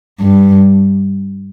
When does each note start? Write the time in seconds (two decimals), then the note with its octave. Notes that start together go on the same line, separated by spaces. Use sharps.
0.20 G2